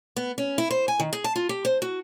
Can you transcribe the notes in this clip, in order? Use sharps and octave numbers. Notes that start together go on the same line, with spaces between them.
B3
C#4
E4
C5
G#5
D#3
G#4
A5
F4
G4
C5
F#4